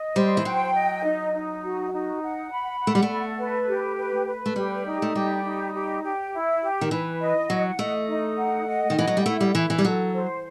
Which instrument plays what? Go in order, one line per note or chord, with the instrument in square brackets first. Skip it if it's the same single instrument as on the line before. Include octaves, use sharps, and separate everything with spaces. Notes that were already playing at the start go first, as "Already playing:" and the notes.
Already playing: [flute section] D#5
[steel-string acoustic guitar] G3 [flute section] C5
[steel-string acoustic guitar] E3
[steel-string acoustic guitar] F#3 [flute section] G5
[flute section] D#5
D#4
D#4
F#4
D#4
F#5
B5
F#5
[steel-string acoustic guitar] A3
G3
A3
[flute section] A4
B4
G4
B4
B4
[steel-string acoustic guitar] A3
[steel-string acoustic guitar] G3 [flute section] G4
[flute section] D#4
[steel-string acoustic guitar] A3
[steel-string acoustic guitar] G3 [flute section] G4
[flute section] D#4
G4
G4
E4
G4
[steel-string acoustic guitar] D#3
[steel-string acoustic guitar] E3 [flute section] B4
[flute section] D#5
[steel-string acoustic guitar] F#3 [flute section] F#5
[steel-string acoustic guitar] A3 [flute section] D#5
[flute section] D#4
F#5
D#5
[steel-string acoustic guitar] D#3
[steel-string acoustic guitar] E3 [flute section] F#5
[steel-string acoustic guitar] F#3
G3
[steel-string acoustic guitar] A3 [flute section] E4
[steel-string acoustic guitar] G3
[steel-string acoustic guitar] E3 [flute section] E4
[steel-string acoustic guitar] E3
G3
[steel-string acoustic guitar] F#3 [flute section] A4
[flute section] C5